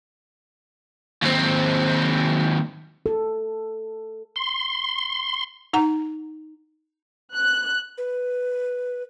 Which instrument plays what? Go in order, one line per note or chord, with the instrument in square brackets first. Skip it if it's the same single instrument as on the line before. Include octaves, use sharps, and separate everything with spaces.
[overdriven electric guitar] D#2 C4
[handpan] A4
[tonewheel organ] C6
[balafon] D#4 F#5 A#5
[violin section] F#6
[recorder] B4